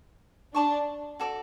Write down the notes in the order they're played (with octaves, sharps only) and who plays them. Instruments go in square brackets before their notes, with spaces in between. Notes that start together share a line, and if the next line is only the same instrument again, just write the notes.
[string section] D4 [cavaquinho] D5 A5 C#6
[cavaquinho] F#4 A4 D5